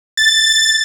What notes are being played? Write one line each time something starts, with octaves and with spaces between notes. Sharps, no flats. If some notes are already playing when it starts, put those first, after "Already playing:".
A6